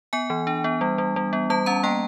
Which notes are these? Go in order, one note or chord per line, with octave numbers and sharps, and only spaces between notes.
B3 G#5
E3
D4
B3
G3
G3
G3
B3
G3 A5
C#4 A#5
A#3 G5